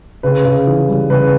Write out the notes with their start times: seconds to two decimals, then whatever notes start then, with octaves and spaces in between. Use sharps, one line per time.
0.23 C#3 B4
0.45 C#3
0.67 E3
0.89 G3
1.10 C#3 B4